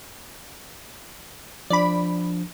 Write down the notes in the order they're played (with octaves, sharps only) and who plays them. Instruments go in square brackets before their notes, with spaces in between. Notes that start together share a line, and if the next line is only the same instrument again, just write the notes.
[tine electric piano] F3 D4 [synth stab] D5 B5